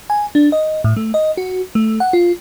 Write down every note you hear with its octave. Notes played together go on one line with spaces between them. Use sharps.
G#5
D4
D#5
A2
A3
D#5
F#4
A3
F#5
F4